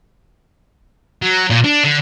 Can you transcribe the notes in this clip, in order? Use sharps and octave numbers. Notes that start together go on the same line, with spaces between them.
F#3
A#2
D4
D3